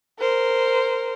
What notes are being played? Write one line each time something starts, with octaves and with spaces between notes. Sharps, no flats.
A#4 C5